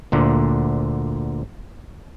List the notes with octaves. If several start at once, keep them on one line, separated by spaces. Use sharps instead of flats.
D2 A#2 D3